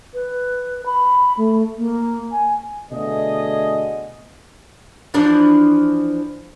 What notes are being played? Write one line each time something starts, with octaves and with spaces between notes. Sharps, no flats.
B4
B5
A3
A#3
G#5
B2 D3 A3 G#4 D#5
E3 F3 D4